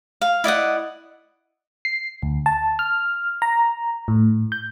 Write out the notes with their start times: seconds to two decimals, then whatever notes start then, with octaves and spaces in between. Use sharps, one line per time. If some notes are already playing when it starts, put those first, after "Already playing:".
0.21 F5
0.44 E4 D5 D#5 F#5
1.85 C7
2.23 D2
2.46 A5
2.79 F6
3.42 A#5
4.08 A2
4.52 G6